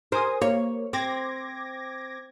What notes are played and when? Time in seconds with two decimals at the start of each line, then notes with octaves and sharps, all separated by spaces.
0.12 A#4 C5 G#5 D#6
0.42 A#3 C#5
0.93 C4 D6 G#6 A#6